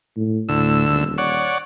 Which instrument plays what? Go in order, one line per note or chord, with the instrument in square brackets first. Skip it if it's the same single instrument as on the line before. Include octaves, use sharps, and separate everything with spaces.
[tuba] A2
[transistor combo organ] D2 E6 [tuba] A2
[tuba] D#1
[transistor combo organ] C#5 D5 F#5